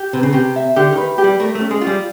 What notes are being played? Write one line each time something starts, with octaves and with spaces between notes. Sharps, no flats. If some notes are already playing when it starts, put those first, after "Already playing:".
Already playing: G4
C3 B4
C#3
C3 G4
E5
D3 G4
D#3 B4
G4
G3
A3 A#4
A3
C#4
G#3
F4
G3